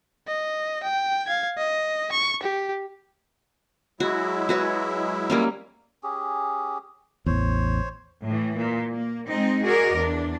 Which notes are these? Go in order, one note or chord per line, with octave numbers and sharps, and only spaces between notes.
D#5
G5
F5 G#6
D#5
C#6
G4
F#3 G#3 E4 F#4
F#4 B4 C#5
G3 A#3 C#4
C#4 G4 G#4
A1 E2 C5 C#5
A2 E3
A#2
A#3
G#3 C4 D#4
F#4 G#4 A#4 D5 D#5
E2 D4